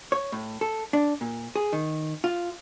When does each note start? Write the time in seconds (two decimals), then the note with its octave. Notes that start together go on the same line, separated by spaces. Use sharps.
0.12 C#5
0.32 A2
0.61 A4
0.93 D4
1.21 A#2
1.56 G#4
1.73 D#3
2.24 F4